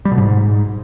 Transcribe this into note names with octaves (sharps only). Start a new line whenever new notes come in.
G3
B2
G#2